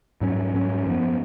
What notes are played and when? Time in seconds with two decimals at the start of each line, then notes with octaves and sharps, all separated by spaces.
0.21 G#2 F#3 C#4
0.54 G#2 F#3 C#4
0.86 F#2 F3 B3